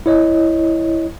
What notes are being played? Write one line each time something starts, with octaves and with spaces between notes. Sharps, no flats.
E4 C#5 D#5